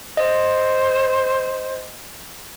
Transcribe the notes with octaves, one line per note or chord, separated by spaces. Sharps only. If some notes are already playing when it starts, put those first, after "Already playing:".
C5 D#5